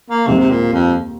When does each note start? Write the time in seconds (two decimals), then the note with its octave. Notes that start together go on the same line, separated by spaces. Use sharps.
0.10 A#3
0.27 D#2 C3 D#3 G#3 C4
0.39 C3
0.50 A#2
0.73 F2